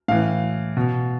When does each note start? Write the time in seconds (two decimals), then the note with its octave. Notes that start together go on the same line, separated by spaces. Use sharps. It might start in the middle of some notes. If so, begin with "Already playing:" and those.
0.08 A2 E3 F5
0.77 B2